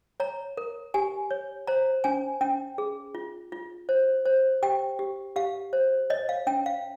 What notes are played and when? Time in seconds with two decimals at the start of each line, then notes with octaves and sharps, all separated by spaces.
0.20 C#5 A#5
0.57 A#4
0.94 G4 G#5
1.31 C#5
1.67 C5 A#5
2.04 C#4 G#5
2.41 C#4 G5
2.78 G#4
3.15 F4
3.52 F4
3.89 C5
4.26 C5
4.63 G4 G5
4.99 G4
5.36 G4 F5
5.73 C5
6.10 C#5 D#5
6.29 F5
6.47 C#4 G5
6.66 F5